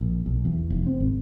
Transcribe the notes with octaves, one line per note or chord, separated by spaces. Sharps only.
A#1
B1
E2
F1
C4
G#1